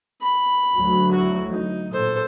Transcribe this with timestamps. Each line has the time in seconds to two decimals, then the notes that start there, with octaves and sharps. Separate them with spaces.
0.21 B5
0.75 D2 F#3
1.12 E4 F#4
1.50 D#4
1.93 A#2 A4 C5